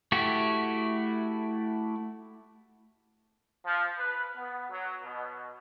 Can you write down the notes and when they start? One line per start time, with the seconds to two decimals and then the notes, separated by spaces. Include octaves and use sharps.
0.12 A3 E4 F#4 G4
3.66 F3
3.98 B4
4.36 B3
4.70 F#3
5.02 B2